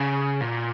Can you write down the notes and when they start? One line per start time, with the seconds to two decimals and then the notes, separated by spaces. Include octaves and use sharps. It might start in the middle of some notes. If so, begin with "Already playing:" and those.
Already playing: C#3
0.41 A#2